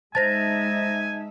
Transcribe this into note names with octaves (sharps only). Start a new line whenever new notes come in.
G#3 D#4 C5 E5 G#5 A5 A6 A#6